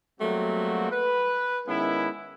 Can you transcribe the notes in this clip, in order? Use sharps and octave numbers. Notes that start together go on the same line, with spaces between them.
F#3 G3 A3 A#3 C4 F#4
B4
D#3 G#3 B3 C#4 E4